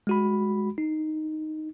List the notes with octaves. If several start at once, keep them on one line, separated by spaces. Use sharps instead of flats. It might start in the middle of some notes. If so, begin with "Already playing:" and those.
G#3 F#4 B5
D#4